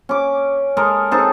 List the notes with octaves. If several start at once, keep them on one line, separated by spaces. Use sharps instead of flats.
C#4 D6
G#3 A4 A#4 D#5
C4 D#4 G#4 A4